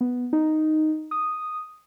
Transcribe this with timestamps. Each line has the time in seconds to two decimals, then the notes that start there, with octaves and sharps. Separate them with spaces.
0.01 B3
0.33 D#4
1.11 D#6